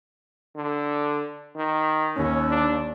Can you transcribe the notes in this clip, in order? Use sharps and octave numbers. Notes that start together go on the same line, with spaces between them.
D3
D#3
D#2 C#4
D4